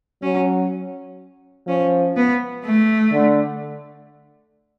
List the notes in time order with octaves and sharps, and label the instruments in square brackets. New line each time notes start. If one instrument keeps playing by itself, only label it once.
[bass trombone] F#3 [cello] C#4
[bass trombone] F3 [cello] C#4
[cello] B3
A3
[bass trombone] D3